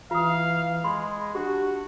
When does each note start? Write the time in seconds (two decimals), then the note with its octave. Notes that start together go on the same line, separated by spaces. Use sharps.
0.11 E3 F4 F5 D#6
0.84 G#3 B5 C6
1.35 D4 F#4 G4